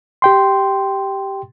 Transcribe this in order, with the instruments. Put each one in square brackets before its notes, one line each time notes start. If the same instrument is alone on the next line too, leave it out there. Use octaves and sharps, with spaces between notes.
[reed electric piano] G4 G5 C6